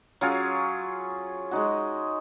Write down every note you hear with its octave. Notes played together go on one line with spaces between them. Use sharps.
F#3 C#4 F4 G#4
G#3 D#4 F#4